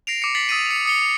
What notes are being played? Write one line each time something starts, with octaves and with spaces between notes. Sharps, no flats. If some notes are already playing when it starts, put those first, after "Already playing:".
A#6 C7 D7 F7
D6 C#7
A6 B6 C7 F#7
D#6 E6 A6 B6 D#7
C#7
D#6 C#7 G7